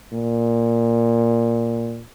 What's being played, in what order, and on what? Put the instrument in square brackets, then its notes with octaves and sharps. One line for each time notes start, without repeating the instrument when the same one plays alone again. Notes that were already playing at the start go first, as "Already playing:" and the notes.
[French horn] A#2